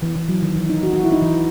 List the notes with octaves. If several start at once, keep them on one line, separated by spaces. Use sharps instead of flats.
E3
E3
F#3
D#3
E3
D#4
F#4
F#4
E4
D#4
E3